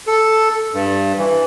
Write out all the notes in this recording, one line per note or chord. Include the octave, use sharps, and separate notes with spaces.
A4
G2
E3